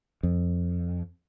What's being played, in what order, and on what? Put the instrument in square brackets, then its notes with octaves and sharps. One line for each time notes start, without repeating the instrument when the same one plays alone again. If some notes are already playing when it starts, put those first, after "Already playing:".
[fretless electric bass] F2